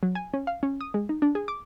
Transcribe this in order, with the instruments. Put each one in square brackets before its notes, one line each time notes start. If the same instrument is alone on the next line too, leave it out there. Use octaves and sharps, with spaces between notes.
[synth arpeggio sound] F#3
G#5
C#4
F5
C#4
D#6
G#3
D#4
D4
G#4
D6